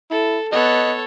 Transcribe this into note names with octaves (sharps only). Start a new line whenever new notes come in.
E4 A4
B3 A4 C#5 D#5 F#6